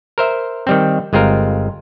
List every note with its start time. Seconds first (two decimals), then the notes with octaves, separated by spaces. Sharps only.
0.18 A#4 C5 E5
0.67 D#3 G3 C4
1.13 G1 G#3 C4 F4 A#4